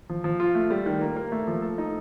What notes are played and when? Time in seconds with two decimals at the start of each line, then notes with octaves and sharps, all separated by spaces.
0.09 F3
0.24 F3
0.40 F4
0.55 A3
0.70 G3
0.86 D#3
1.01 A#3
1.16 A#3
1.32 A3
1.47 F3
1.62 A4
1.78 D#4